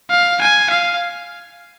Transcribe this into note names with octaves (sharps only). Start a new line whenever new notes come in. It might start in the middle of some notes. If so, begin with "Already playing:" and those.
F5
G#5
F5